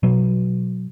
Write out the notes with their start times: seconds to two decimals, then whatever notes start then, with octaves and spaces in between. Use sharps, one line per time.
0.03 B2 F#3